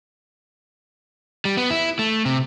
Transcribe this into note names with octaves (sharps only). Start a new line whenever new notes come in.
G3
B3
E4
A3
C3